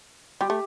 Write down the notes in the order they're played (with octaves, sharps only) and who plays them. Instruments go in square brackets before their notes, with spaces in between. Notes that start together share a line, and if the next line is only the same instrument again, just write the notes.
[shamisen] G3 [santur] G4
[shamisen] A3